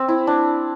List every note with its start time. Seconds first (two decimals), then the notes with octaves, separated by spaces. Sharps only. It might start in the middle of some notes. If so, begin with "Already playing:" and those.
Already playing: C4
0.08 E4
0.27 D4